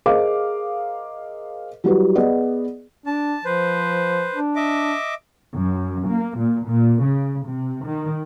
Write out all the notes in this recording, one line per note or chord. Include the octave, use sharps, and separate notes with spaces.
G#4 A#4 C5 D#5 F5 D6
F#3 G3 E4 F#4 G4 B4
B3 G#4 D5 D#5
D4 A5
F3 B4 C5
D4
D#5 E5 D6
F#2
A#3
A#2
A#2
C#3
C3
D#3